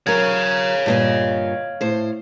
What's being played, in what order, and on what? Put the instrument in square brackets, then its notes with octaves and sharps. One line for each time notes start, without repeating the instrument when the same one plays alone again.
[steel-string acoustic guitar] F#3 A#4 [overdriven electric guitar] C#5 F5
[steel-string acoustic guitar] G2 A#2 D#5
A2 C5